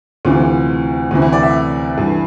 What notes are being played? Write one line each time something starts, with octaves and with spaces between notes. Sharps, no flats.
D2 C3 E3 F4
D2 C3 E3
E4
D5
E5
G2 E3